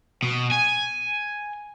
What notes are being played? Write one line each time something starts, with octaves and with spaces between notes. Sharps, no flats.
B2
G#5